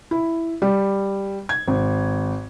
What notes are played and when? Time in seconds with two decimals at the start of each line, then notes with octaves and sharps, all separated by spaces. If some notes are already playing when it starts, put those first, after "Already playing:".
0.11 E4
0.62 G3
1.49 G#6
1.68 G#1